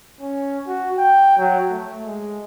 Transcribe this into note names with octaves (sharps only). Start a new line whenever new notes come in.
C#4
F#4
G5
F#3
A3
G#3